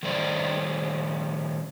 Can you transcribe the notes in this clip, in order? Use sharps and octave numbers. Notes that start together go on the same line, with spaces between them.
D#3 G3 A3 C5 D5